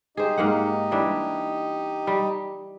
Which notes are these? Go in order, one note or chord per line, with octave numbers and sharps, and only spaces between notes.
D#4 G4 G#4 C5 D#5
G#2 A#3 F#5
E3 G3 D4
G3